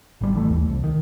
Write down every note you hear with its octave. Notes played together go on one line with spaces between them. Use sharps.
G#1 G3
E3 A3
D#2
C2
D#3